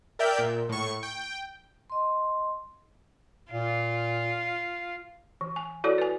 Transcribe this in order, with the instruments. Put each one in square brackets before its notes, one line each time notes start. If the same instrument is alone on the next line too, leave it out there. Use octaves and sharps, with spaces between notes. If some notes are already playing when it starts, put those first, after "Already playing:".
[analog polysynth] A#4 D5 E5 G5 G6
A#2
A2 C#6
G5
[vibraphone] D#5 C6
[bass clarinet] A#2 [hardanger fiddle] F4
[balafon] E3
G#5
E4 F#4 A4 C#5 D5
B4 G#5